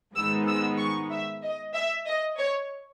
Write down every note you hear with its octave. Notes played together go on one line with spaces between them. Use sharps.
G#2 D#3 G#3 B3 D#4 E6
E6
C#6
E5
D#5
E5
D#5
C#5